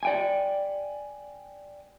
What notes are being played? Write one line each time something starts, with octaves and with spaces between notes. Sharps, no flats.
D5 G5 G#5